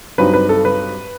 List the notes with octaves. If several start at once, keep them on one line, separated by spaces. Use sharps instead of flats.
G2 F#3 C4 D#4 B4
B4
A4
B4